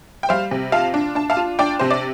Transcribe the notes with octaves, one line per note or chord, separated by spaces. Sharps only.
G5
G3 C5 F5
C3
F4 F5 A5
D4
D4 A5
F5 A5
F4
D4 D5 G5
C3 C5
D5